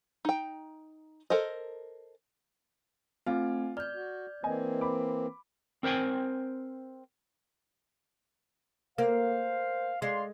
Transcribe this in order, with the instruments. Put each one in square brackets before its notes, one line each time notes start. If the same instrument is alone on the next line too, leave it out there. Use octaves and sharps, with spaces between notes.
[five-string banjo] D#4 G5
A4 A#4 C5 D#5
[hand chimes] A3 C4 G#5 [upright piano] F4
[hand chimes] D5 G6 [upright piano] F6
[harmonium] F#4
[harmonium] E3 A#3 C4 [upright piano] D#5 G#5
[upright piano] B5 D6
[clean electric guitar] C4 A#4 C5 G5 G#5
[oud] A#3 [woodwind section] C5 F5
[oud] G#3 [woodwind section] D5 F5 C6